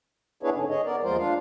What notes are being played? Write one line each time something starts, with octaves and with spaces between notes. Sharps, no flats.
B3 D4 E4 G#4 B4 C#5
G#2 D3 C#4
G#4 C#5 D#5
B3 A#4 D5
D#2 F3 G#3 F4 A#4 C5
D4 F4 F5